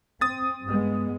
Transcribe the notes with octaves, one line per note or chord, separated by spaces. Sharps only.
C4 D#6 A6
G2 G#3 B3